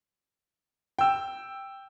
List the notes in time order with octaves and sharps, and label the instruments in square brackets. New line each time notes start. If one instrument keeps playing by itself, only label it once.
[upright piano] G5 E6